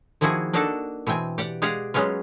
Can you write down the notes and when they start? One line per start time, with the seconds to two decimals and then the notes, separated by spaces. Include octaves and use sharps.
0.21 D#3 F3 A#3 E4 F#4 G#4
0.53 A#3 D4 D#4 F#4 A4
1.07 B2 E3 C4 G5 G#5
1.38 G4 D5 F#5
1.62 G#3 G4 G#4 D5 F5 F#5
1.94 F#3 G#3 B3 C#4 F4